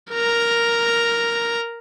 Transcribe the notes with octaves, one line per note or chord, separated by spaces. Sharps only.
A#4 A#5